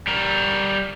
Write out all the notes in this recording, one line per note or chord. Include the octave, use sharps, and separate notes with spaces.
G3 A#4